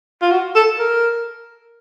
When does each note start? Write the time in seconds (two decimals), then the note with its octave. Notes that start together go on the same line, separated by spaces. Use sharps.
0.22 F4
0.31 F#4
0.56 A4
0.79 A#4